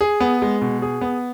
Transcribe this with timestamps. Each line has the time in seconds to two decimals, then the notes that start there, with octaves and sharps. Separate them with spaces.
0.01 G#4
0.20 B3
0.42 G#3
0.61 B2
0.82 G#4
1.01 B3